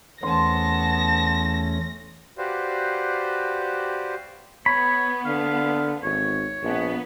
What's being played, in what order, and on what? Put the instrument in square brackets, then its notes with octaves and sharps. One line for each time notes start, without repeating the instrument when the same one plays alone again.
[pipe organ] E2 A3 C#4 [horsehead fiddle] B3 A5 [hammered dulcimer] C6 [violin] A#6
[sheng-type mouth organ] F#4 G4 B4 C5 D5 F5
[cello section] B3 [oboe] C#5 [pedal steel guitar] B5
[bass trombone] D3 [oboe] F5
[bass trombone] G#1 [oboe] C#5
[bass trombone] A#1 [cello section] B3